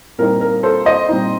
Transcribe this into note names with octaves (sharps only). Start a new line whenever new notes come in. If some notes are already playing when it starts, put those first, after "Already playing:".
A#2 G3 C4 D#4 A#4
A#4
A4 C5
C5 D#5
A#2 G3 C4 D#4